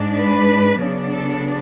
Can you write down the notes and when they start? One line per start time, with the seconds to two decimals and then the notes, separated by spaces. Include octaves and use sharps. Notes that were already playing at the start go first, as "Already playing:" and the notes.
Already playing: G#2 G#3 D4
0.15 B4
0.80 C#3 F#3 B3 D4
1.12 A4